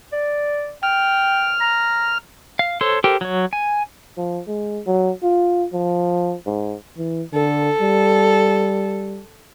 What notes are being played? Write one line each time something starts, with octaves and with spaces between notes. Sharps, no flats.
D5
G5 F6
A#5
F5
A4 C5 C#5 C6
G4 A4 A#4 C5 G5
F#3 C#5
G#5
F3
G#3
F#3
F4
F3
G#2
E3
D3 A4
G3